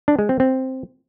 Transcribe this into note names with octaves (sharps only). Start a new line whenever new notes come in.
D4
G#3
C4
C4